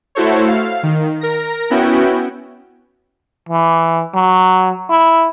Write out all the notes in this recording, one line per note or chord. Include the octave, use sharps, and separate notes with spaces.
A3 E4 F#4 A4 C5 C#5
F5
D#3
A#4 A#6
B3 C#4 E4 F#4 G5
E3
F#3
E4